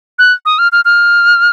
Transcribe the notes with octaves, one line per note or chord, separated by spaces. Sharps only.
F#6
D#6
F6
F6
F6